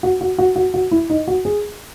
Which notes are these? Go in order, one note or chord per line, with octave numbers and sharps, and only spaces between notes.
F#4
F#4
F#4
F#4
F#4
E4
D#4
F#4
G#4